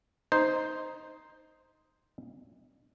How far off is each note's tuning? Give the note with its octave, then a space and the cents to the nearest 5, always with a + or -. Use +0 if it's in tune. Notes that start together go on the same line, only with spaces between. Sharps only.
D#4 +0 C5 +0